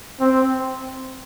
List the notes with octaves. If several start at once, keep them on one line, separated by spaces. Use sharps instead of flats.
C4